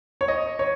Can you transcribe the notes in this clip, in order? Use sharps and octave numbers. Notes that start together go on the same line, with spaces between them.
C#5
D#5
C#5